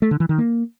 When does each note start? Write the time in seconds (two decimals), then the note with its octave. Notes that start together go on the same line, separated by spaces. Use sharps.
0.02 A3
0.11 D3
0.20 E3
0.29 D#3
0.38 A#3